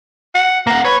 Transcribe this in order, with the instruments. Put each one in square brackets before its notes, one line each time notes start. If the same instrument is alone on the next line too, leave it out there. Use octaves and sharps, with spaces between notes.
[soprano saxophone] F#5
[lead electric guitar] A#3 F#5 [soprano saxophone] A#5
[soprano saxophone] B4 [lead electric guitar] C#5